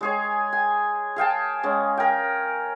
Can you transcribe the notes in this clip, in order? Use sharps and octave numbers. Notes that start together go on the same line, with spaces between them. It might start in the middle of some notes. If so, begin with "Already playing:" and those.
G#3 G#4 C#5
G#5
G#4 F5 G5 A5
G#3 C#4
A#4 G5